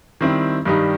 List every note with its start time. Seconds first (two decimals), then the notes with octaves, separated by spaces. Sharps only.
0.21 D#3 G3 C4 E4
0.65 G2 D#3 G3 D#4 G4